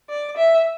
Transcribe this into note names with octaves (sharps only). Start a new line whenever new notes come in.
D5
E5